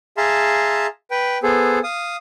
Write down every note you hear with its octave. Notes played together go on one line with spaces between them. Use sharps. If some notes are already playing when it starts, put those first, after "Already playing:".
G#4 E5 F5 A5 A#5 C6
B4 G5
B3 G#4 A4 C5
F5 D#6